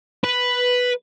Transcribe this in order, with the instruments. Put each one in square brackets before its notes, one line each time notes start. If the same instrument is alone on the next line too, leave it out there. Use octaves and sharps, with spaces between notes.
[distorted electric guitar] B4